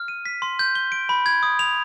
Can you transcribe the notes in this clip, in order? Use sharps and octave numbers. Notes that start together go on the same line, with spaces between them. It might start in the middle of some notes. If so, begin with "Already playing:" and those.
Already playing: F6
D#7
B6
C6
G6
G7
D7
B5
G#6
D#6
F7